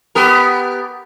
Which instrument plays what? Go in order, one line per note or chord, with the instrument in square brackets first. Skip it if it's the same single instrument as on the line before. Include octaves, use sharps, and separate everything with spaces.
[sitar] B3 G4 A#4